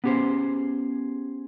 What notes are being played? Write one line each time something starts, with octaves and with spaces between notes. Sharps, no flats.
B3 C#4 G4 G#4 C5